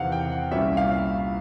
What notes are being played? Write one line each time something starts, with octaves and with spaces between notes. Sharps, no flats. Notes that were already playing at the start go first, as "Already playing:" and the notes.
Already playing: E2 C3 D#3 F5 F#5
G5
F#5
C2 A#2 G3 A#3 C#4 E5
F5